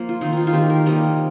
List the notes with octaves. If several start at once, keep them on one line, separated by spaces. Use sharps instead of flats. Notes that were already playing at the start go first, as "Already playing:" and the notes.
Already playing: F3 A#3
F4
D#3 C4 D#4
D#4 F4
F4
D#3 C4 G4
A#4
C3 G3 A#3 D#5